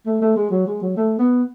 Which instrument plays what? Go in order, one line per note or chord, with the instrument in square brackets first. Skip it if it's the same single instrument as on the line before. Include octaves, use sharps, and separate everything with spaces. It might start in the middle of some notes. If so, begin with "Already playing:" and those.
[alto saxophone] A3
A3
G#3
F#3
G#3
F#3
A3
B3